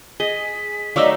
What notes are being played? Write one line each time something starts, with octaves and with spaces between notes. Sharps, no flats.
G#4 D#5 B6
F#3 A3 D4 D#4 D#5 F5 D6 E6